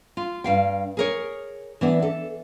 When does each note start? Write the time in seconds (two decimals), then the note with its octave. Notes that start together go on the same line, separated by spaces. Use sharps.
0.17 F4
0.44 G2 F5 G5
0.97 G#4 A#4 C#5
1.81 E3 B3 D4
2.02 A4